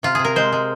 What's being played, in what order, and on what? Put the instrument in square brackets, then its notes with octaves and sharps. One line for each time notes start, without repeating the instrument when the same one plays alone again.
[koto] C3 F4
C3 G#4
A#4
G#3 C5
G#3